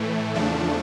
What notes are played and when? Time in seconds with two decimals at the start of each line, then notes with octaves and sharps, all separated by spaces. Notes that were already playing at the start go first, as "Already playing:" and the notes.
Already playing: A2 E3 A3
0.34 E2 C#3 F3 A3 D4